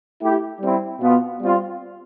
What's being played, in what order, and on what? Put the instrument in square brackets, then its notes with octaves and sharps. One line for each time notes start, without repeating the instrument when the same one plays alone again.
[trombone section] A3 E4 G4
G3 C4 E4
B2 B3 F4
G3 C4 F4